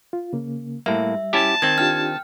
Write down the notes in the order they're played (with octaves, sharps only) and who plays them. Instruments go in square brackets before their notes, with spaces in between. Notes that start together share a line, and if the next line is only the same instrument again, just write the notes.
[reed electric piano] F4
C#3 A#3
[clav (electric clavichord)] A2 A#3 [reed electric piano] G3 [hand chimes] E5
[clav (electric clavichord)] C#4 E4 G4 [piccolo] A5
[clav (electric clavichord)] D#3 C4 [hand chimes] G#6
[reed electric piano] D4 F4 G4 [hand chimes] G5 F6